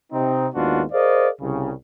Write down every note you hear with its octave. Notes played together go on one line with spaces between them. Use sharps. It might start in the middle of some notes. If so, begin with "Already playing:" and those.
C3 C4 D#4
D#2 G#2 B3 D4 F4 F#4
G#4 A#4 C5 D5 D#5 F5
C2 C#3